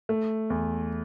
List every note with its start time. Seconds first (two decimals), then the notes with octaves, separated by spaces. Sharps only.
0.09 A3
0.50 E2